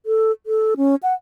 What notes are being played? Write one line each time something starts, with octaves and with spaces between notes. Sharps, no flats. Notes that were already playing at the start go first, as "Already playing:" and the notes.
A4
A4
C#4
F#5